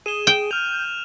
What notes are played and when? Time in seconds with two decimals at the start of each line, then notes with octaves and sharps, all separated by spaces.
0.06 G#4 D#7 E7 G7
0.27 G5
0.51 F6 G6 F7